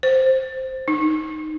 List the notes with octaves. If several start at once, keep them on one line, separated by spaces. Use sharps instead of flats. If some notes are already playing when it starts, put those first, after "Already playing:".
C5
D#4